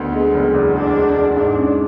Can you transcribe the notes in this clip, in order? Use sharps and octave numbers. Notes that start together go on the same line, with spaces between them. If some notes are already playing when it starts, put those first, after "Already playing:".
Already playing: D2 B3
G#3
F#1
E2
E2 D4
G#3
E2
G#2 D4
C#4